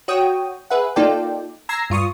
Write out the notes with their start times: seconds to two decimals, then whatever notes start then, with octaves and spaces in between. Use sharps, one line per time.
0.08 F#4 C#5 G5 D#6
0.70 G#4 B4 E5 F#5
0.96 A#3 D#4 F4 A4 D5 G5
1.69 A#5 E6 G#6 A#6 C7
1.90 G2 F4 C#6 D#6